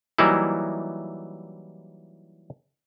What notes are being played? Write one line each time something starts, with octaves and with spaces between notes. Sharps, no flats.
E3 F#3 G3 A#3 D#4 E4